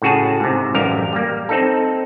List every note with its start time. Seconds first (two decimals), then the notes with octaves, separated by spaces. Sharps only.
0.02 A2 C#3 F#4 G#4 A5
0.40 G#2 C3
0.74 A1 F#2 G3 A#4 F5
1.13 G3 A#3
1.49 C4 D#4 A4